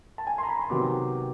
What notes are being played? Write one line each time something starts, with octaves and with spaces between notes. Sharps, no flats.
A5
G#5
A#5 C6
B5
C6
C3 D#3 F#3 B3 D6